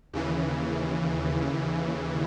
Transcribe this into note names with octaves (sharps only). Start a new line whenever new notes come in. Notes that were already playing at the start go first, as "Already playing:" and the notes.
D#2 C#3 E3